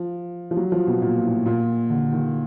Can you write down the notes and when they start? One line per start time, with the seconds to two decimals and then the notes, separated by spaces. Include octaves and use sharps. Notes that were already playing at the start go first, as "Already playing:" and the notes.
Already playing: F3
0.51 F3
0.57 F#3
0.72 F3
0.87 B2
1.02 A#2
1.24 A2
1.46 A#2
1.90 D3
2.12 D#3